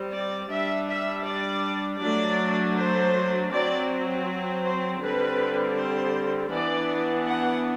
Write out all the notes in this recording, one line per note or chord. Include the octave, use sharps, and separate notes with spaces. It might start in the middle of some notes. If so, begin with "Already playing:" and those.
Already playing: G3 C4
D5
G3 D4 E5
E5
D5
F#3 A3 D4 D5
C5
F#3 C4 D5
C5
D3 G3 C4 B4
C5
E3 B3 D4 D5
F#5